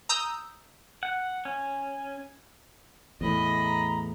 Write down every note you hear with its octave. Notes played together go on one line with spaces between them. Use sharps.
A#5 D#6 E6 G6
F#5
C#4
E2 A2 D#5 B5
A#5